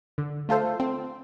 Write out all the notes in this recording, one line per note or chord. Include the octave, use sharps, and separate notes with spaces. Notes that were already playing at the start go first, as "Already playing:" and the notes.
D3
A3 F4 A4 C5
C4